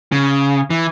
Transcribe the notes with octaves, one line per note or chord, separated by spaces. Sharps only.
C#3
E3